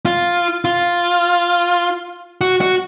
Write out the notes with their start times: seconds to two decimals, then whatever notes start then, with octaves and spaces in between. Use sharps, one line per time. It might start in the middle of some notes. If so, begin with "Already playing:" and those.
0.06 F4
0.65 F4
2.41 F#4
2.61 F#4